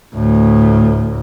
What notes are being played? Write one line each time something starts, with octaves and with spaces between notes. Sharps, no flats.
D2 A2